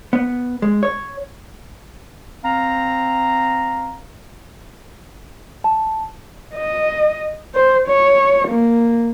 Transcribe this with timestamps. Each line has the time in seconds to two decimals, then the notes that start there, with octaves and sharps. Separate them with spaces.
0.13 B3
0.62 G#3
0.83 C#5
2.44 C4 F5 A#5
5.64 A5
6.55 D#5
7.55 C5
7.88 C#5
8.48 A#3